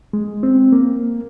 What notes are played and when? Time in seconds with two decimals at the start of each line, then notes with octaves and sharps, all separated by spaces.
0.13 G#3
0.43 C4
0.73 A#3